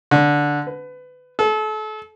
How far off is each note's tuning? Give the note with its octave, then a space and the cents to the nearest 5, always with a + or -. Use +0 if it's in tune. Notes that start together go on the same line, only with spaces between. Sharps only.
D3 -5
B4 +25
A4 -35